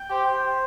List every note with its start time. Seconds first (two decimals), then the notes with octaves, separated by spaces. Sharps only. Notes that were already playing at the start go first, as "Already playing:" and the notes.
Already playing: G5
0.10 G4 C5